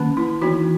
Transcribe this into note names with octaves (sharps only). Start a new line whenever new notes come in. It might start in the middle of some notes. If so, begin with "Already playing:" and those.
Already playing: D#3 A#3 C#4
E4
E3 B3 D#4 F#4